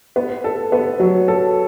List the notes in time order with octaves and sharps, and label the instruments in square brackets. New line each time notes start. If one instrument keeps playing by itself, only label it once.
[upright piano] B3
A4
B3
F#3
A4